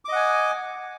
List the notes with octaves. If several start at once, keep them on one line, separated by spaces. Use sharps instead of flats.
D#5 F#5 G#5 D6